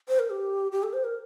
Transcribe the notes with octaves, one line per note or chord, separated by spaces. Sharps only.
C5
A#4
G4
G4
A4
C5
A#4